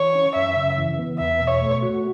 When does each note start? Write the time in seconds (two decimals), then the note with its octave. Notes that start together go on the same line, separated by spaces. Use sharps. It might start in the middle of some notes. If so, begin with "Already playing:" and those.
Already playing: E3 C#5
0.15 C#4
0.35 F#2 E5
0.56 C#3
0.78 E3
0.99 B3
1.19 E2 E5
1.40 B2
1.47 C#5
1.61 A3
1.82 F#4